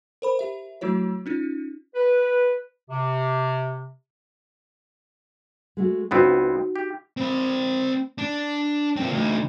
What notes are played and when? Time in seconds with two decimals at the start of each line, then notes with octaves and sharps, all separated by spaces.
0.22 A#4 C5 B5
0.39 G4 E5
0.81 F#3 A3 E4 F#4 C#5
1.26 C#4 D#4 F4
1.95 B4
2.89 C3
5.77 G#3 A3 F#4
6.11 C#2 B3 C4 D#4 F#4
6.76 G4
7.17 C4 B5
8.18 D4
8.97 A#2 C4
9.11 D2 D#4